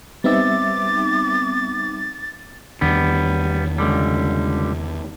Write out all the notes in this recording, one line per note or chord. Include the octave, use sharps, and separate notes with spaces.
G3 B3 C4 D#4 E5 D6 A6
E2 D#3 G3 B3 D4
C#2 D3 G3